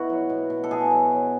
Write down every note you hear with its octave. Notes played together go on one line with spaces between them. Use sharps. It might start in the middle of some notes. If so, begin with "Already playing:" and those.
Already playing: B2 E4 F#4
F#3
B2
B2
A4
B2 G#4
F#3
F#3